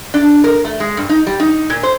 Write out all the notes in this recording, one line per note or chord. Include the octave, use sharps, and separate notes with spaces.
D4
A#4
A3
G#3
G2
D#4
G3
D#4
A#2
C5